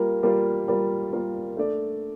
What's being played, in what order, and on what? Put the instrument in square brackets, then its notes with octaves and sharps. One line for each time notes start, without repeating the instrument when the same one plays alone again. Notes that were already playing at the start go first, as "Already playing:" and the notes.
Already playing: [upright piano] G3 A#3 F4 A#4
G3 A#3 F4 A#4
G3 A#3 F4 A#4
G3 A#3 F4 A#4
A3 D4 A4 D5